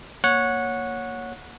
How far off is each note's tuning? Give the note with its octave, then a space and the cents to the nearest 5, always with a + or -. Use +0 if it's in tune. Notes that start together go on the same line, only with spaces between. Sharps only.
A#3 +0 C#5 +0 F#5 -15